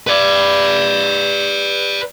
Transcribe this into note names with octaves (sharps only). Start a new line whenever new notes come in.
B4 D5